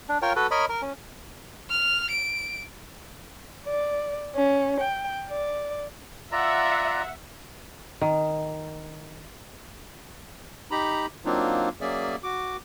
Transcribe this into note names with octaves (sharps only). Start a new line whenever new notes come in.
D4
F4 A#4 C#5 G5
F#4 A4 B4
A#4 C#5 D#5 B5
A#4
C#4
F6
D7
D5
C#4
G5
D5
F4 D5 E5 F#5 A#5
D#3
D#4 G4 A#5 B5
F#3 A#3 C4 D4 D#4 F4
F#3 A#3 C#4 G#4 D5 E5
F#4 D6